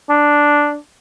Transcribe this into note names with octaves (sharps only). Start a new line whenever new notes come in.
D4